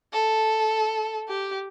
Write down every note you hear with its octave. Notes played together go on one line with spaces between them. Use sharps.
A4
G4